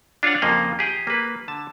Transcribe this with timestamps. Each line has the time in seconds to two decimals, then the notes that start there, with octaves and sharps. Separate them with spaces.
0.23 D4 F4 C#5 F5 F#5
0.42 F2 C#3 F3 A#3 D#5
0.79 G4 G#4 G5
1.07 A#3 B4
1.48 D3 A5